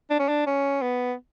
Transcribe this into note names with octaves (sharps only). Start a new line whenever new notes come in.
D4
C#4
D4
C#4
B3